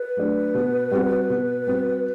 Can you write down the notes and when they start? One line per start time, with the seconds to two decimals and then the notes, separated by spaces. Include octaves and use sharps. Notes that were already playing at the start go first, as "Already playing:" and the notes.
Already playing: B4
0.17 F#3 A3 D4
0.54 B2
0.92 G3 C4 F#4
1.29 B2
1.67 G3 C4 F#4